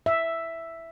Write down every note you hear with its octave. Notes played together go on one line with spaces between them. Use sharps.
E5